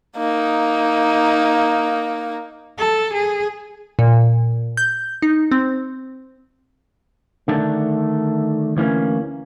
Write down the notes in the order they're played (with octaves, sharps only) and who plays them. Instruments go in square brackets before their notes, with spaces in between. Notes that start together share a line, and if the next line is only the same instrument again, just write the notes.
[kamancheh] A#3 D#4
[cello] A4
G#4
[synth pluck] A#2
G6
D#4
C4
[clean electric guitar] D3 D#3 A3 D4
D2 E3 A#3 C#4